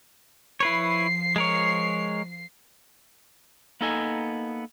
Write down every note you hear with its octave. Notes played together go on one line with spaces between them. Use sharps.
F3 E4 B4 C#5 C7
G#3 A#4 C#5
A#3 B3 D#4 A4 D#5 G#5